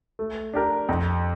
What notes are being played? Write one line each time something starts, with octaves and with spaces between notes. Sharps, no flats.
A3
D4 G4 A#4
F2